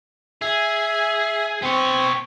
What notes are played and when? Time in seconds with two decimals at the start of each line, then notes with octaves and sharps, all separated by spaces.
0.41 G#4 E5
1.62 B3 C4 C#5